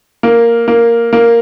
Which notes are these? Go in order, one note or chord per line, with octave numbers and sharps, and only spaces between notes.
A#3
A#3
A#3